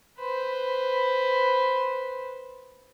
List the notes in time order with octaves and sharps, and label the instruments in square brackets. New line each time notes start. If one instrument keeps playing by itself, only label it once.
[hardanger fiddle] B4 C5